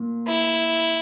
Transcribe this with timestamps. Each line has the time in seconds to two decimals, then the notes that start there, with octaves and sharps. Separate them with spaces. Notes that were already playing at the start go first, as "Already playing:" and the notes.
Already playing: A#2
0.27 E4